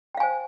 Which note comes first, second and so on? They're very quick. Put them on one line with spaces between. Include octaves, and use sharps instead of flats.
G5 F5 G#5 C5